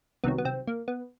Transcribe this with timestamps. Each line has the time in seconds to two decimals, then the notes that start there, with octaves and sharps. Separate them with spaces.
0.24 C2 C3 D#3 F#3 B3
0.38 B3
0.45 C3 C4
0.67 A#3
0.88 B3